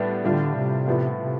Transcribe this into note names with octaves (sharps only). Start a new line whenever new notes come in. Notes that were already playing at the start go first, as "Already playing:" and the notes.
Already playing: A2 G3 B3 D4
A2 D3 G3 D4 F4
C3
A2 F3 B3 F4
C3